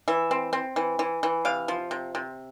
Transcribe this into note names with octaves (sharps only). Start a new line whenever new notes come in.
E3 E5
C4
C4
E3
E3
E3
C3 F5
F3
C3
C3